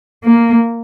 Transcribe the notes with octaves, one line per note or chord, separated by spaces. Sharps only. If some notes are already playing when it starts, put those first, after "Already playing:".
A#3